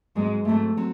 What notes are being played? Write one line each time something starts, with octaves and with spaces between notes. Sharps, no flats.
G#2 F#3 G#3 C4
G#2 F#3 A3 C4
F#3 C4